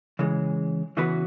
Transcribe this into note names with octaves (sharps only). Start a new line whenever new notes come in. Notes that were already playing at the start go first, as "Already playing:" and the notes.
C#3 E3 G#3
C#3 E3 B3 F#4 B4